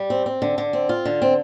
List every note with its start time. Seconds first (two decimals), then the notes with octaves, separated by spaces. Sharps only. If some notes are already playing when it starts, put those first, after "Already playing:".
Already playing: G3
0.10 C4
0.26 C4
0.42 D3
0.58 D3
0.73 C4
0.89 F4
1.05 D3
1.22 C4